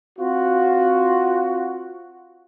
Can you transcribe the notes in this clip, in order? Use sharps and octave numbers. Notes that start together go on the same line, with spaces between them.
C4 F4 F#4